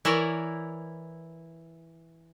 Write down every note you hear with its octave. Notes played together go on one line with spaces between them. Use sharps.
E3 E4 A#4 C#5 D5